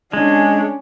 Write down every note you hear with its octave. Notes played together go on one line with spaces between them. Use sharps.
G#3 C#4 D4